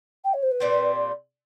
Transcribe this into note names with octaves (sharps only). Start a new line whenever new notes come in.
G5
C#5
C5
B4
A#2 G3 C4